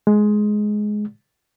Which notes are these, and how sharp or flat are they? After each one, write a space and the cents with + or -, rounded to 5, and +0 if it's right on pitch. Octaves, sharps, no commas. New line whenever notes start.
G#3 +10